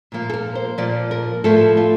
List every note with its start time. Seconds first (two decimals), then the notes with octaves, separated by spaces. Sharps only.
0.12 A#2 F3 A#3
0.30 A4
0.34 A#4
0.55 C5
0.78 A#2 F3 A#3 D5
1.11 A#4
1.44 A2 F3 A3 A4
1.77 F4